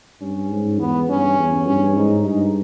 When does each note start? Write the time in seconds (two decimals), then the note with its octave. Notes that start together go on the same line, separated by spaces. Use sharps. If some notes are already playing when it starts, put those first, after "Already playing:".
0.21 G2 C#4
0.50 G#2
0.79 E2 B3
1.09 G2 C#4
1.38 E2
1.67 G2 C#4
1.96 G#2 D#4
2.25 G2 D#4